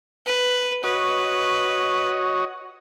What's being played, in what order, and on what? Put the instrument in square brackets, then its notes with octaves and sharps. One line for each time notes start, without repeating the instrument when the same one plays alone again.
[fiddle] B4
[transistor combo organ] F#4 C#5 D#5 [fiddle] B4